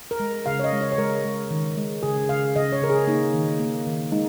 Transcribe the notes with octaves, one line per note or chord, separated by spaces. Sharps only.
A#4
G#3
C#3 F5
C#5
D#5
G#3
C#5
C#5
G#3 A#4
G#3
D#3
G#3
C#3 G#4
C#3 F5
C#3 D#5
C#5
C#3 A#4
G#4
A#3 D#4
D#3
A#3
D#3
G#3 D#4